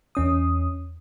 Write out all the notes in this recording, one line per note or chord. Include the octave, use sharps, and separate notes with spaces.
E2 C#4 D#6